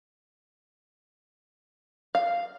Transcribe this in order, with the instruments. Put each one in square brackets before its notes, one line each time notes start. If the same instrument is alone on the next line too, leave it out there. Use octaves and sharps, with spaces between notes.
[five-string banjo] F5